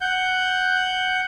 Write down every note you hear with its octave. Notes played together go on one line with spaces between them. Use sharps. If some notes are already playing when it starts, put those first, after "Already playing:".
F#5 G6